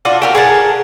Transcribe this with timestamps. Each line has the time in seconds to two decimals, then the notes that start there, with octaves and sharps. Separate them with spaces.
0.05 D4 F4 F#4
0.22 F#4 G4 A#4
0.35 G#4 A#4 F#5 A5